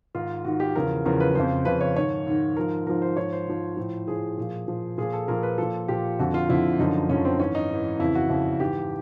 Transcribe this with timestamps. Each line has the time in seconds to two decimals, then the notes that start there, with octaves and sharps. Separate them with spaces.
0.15 G#2 D#3 F4
0.44 G#2 D#3 F#4
0.60 G4
0.75 E2 C#3 F3 A#4
1.06 E2 C#3 F3 A#4
1.20 B4
1.35 F2 C#3 F3 C5
1.65 F2 C#3 F3 B4
1.81 C#5
1.96 G#2 D#3 C#5
2.27 G#2 D#3
2.57 G#2 F3 A#4
2.86 G#2 F3 A#4
3.02 C5
3.17 G#2 F3 C#5
3.33 C5
3.47 G#2 F3
3.77 A2 F3
4.08 A2 F3 G#4
4.38 A#2 F3
4.68 A#2 F3
4.98 A#2 F3 G#4
5.13 A4
5.28 A#2 F3 A#4
5.43 B4
5.58 A#2 F3 A4
5.88 A#2 F3 G4
6.19 F2 D3 F3 F#4
6.34 F4
6.49 F2 D3 F3 E4
6.79 F#2 D3 F3 D#4
7.09 F#2 D3 F3 C#4
7.25 C4
7.39 G#2 E3 C#4
7.55 D#4
7.70 G#2 E3
7.99 F2 C#3 E3 E4
8.15 F#4
8.30 F2 C#3 E3
8.60 G#2 E3 G4